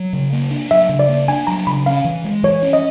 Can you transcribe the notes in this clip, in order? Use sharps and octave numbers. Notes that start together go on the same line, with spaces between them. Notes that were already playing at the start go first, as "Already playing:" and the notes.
Already playing: F#3
C#3
A#3
D4
F#3 E5
C#3
D5
A#3
D4 G#5
F#3 A#5
C#3 B5
C#4 F5
E3
G#3
E3 C#5
C#4
D#5